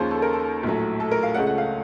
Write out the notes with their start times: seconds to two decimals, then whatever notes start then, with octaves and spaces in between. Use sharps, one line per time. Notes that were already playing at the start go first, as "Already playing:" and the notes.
Already playing: D#2 C#3 F3 A#3 C#4 C5
0.11 A4
0.22 A#4
0.33 A4
0.63 A#1 A2 F#3 A3
1.00 A4
1.11 A#4
1.23 F5
1.34 C#2 C#3 A3 C#4 F#5
1.47 F#5
1.58 F5